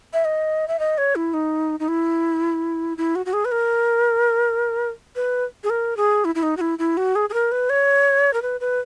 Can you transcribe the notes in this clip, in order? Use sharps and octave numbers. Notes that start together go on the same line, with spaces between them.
E5
D#5
E5
D#5
C#5
E4
D#4
D#4
E4
E4
F#4
F#4
G#4
B4
A#4
B4
G#4
A#4
G#4
E4
E4
D#4
F#4
E4
E4
F#4
G#4
G#4
A#4
B4
C#5
A#4
B4
B4